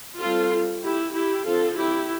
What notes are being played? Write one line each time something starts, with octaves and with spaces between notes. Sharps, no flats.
G3 C4 F4 A4
E4 G4
E4 G4
D3 F3 C4 F4 A4
E4 G4